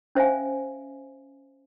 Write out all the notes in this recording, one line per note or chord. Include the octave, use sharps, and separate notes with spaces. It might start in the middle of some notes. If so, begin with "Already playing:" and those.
C#4 C5 E5 F5 G#5